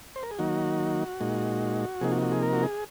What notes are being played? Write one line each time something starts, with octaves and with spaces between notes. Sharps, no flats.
C5
A#4
G#4
D#3 F#3 A#3 D#4 F#4
A#2 G#3 D#4
C3 F3 A#3 D#4 G#4
F#4
F#4
G#4
A#4
F#4
G#4